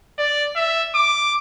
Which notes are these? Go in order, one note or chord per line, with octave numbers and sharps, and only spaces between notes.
D5
E5
D6